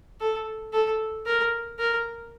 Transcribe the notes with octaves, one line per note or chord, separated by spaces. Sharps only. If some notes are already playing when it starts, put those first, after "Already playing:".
A4
A4
A#4
A#4